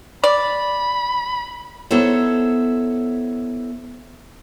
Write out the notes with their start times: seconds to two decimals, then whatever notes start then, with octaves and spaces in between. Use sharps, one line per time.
0.24 D5 B5
1.91 B3 D#4 E4 A4 C5 C#5